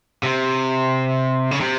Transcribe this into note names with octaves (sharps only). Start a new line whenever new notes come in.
C3
C#3
C3